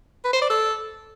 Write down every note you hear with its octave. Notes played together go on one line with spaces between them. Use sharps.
B4
C5
D5
A4